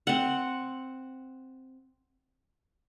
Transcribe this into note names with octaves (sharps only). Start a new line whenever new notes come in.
C4 F#5